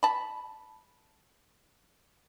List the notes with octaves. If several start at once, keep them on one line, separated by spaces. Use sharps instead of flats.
A5 B5